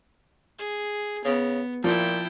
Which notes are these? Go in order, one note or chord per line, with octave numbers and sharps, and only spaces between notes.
G#4
C#3 B3
A#2 F3 E4 G5